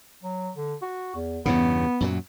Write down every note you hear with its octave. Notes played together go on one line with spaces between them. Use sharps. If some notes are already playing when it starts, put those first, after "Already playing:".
F#3
D3
F#4
E2
E2 G2 C#3 B3
F#2 A#2 F#3